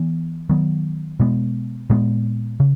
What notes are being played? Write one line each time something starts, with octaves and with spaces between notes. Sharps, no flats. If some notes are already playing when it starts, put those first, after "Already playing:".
Already playing: E3 B3
D#3 F#3 B3
B2 G#3 B3
A#2 G#3 B3
C#3